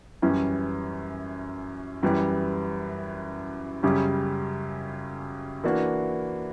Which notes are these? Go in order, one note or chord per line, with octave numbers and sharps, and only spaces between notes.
F#2 E3 G3 C#4
F#2 E3 G3
F#2 C#3 G3 C#4 G4
E3 A#3 D4 F#4